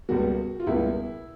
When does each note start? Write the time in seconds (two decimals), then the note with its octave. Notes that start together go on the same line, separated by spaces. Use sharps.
0.09 C#2 B2 G3 A#3 F#4
0.60 F4
0.67 C#2 B2 G3 A#3 E4